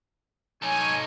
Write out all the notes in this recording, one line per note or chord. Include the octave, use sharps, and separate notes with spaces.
D#4 A4 C#5 G#5